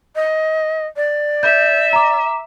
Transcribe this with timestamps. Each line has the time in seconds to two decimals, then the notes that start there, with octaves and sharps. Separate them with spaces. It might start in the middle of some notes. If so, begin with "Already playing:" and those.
0.16 D#5
0.96 D5
1.43 E5 G6
1.93 A#5 D6